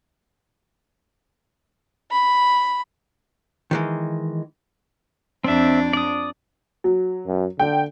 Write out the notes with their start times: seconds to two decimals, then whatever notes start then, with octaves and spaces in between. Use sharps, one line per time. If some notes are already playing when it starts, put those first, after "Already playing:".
2.11 B5
3.71 D#3 E3 G#3
5.44 F2 C4 D4 E5
5.93 D5 D#6
6.84 F#3
7.27 F#2
7.59 D3 G5